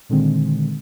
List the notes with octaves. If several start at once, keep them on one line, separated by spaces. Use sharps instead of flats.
A#2 D3 D#3 G#3 C4